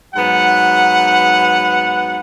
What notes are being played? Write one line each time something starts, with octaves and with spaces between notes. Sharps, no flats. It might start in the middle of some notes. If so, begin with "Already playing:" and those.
G#2 F#3 B3 F#5